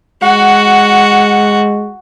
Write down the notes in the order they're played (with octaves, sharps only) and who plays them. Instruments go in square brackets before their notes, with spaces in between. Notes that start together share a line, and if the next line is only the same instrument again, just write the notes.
[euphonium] G#3 [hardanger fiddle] F#4 [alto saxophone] F#5